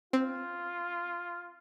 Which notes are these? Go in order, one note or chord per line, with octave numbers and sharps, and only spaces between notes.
C4 F4